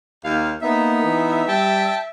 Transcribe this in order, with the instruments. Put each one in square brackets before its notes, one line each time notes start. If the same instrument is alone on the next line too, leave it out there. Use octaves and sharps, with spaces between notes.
[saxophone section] D#2 F5
[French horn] A#3 [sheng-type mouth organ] B3 D#4 [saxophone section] E5
[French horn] E3
[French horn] G3 [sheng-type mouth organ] G5 A5